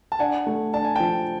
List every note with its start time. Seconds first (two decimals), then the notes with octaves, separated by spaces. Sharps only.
0.12 A5
0.19 D4 F#5 G#5
0.47 A3
0.73 D4 A5
0.84 G#5
0.96 F3 G5 A5